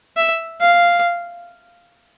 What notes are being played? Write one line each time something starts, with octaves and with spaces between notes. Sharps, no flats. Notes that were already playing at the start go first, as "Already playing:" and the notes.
E5
F5